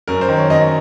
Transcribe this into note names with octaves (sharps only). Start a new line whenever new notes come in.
F#2 A#4
C5
D#3
C#5
F#2 D#5